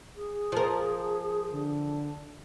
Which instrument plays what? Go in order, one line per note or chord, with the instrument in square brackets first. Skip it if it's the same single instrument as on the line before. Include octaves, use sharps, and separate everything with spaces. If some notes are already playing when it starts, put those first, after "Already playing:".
[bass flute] G#4
[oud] F3 A#4
[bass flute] D3